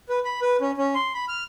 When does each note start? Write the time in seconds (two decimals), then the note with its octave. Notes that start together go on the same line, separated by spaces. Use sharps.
0.09 B4
0.25 B5
0.42 B4
0.61 C#4
0.77 C#4
0.95 C6
1.14 B5
1.28 F6